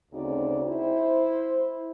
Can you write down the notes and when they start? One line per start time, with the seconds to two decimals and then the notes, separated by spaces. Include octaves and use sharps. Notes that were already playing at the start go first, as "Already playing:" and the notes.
0.12 D2 C#3 C4 D#4 F#4 D5
0.66 E4 C5